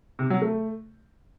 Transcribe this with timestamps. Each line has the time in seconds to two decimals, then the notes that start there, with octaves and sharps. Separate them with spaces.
0.19 C3
0.30 F#3
0.42 A3